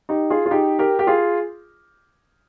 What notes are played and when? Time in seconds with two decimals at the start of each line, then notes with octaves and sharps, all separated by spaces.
0.09 D#4 G4
0.30 F4 G#4
0.46 F4
0.51 D#4 G4
0.79 G4 A#4
0.99 G4
1.07 F4 G#4